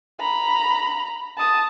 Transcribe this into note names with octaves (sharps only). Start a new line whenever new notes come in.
A#5 B5
A5 D#6